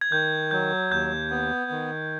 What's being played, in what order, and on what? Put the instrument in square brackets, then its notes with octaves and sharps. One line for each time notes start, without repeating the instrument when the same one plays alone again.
[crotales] G#6
[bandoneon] D#3 [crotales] G6
[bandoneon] F#3 [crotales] G6
[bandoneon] D#2 [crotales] G6
[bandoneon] B3
D#3